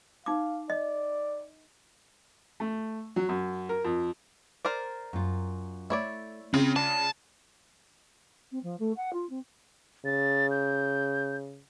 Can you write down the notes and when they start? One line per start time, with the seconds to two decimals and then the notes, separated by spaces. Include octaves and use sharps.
0.26 D#4 F5 D6
0.70 D5 D#5
2.60 A3
3.16 F#3
3.29 F#2
3.69 A#4
3.85 F2
4.65 A#4 C5 D5
5.13 F#2 F4
5.90 A3 E4 C#5 D5
6.54 C#3 C4 F4
6.76 D4 A5
8.51 C4
8.63 F3
8.79 A3
8.96 F#5
9.12 F4
9.29 C4
10.05 C#3 A6
10.51 G6